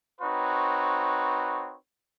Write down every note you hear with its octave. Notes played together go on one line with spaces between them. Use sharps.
C4 D#4 F#4 B4 C#5